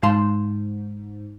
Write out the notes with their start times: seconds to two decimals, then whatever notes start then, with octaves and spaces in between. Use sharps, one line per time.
0.03 G#2 F5 A5 C6